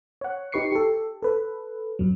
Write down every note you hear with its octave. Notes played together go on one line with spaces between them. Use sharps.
C#5 F#5
D#4 G4 B4 C#6 C7 C#7
G4 A4
A4 B4
F#2 F#3